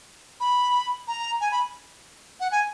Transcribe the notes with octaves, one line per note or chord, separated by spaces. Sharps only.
B5
A#5
G#5
B5
F#5
G#5